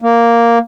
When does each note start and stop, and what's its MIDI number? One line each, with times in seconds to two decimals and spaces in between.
0.02 0.59 58